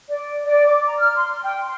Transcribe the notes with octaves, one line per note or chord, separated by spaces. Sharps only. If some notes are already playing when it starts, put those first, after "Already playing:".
D5
D5
D6
A#5
F6
C6
G5
C6